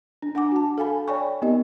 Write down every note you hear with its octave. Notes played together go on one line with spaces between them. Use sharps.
D4
D4 F#5 G#5 D6
F#4 F#5 A5
A4 F5 G#5 B5
C#5 D5 G5 G#5 B5 C#6
B3 C4 D#4 G4 A#4 D#5